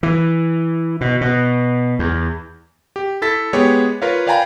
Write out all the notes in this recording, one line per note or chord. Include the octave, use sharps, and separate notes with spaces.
E3
B2
B2
E2
G4
E4 A4 A6 B6
G#3 B3 G4 G#4 C#5
F4 A#4 B4 C#5 F5
D5 F5 G5 G#5 A#5 B5